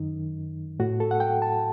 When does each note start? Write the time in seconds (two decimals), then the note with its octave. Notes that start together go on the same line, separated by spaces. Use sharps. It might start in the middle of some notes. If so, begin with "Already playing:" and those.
Already playing: F#2 D#3 D#4
0.79 A2 F#4
1.00 A4
1.11 F#5
1.20 G5
1.42 A5